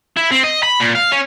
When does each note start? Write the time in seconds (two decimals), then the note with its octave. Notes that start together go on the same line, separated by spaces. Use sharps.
0.17 E4
0.31 C4
0.44 D#5
0.63 B5
0.80 A#2
0.95 F5
1.12 C#4